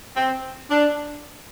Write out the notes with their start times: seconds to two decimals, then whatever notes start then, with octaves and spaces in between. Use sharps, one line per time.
0.17 C4
0.71 D4